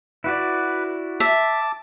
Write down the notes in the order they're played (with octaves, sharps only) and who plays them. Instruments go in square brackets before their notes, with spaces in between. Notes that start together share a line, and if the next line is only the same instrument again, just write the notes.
[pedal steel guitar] E4 F#4 D5 [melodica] B4
[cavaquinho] E5 [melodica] A5 D6